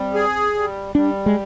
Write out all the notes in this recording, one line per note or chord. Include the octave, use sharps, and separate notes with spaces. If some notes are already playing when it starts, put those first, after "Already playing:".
Already playing: G3 C4
G#4
G3
G3 D4
G#3